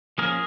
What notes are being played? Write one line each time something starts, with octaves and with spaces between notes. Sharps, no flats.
F3 A#3 C#4 G#4 A#4